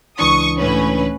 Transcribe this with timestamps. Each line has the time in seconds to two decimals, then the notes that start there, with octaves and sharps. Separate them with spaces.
0.19 C#2 E3 D4 C#6 D#6
0.56 A2 C#4 B4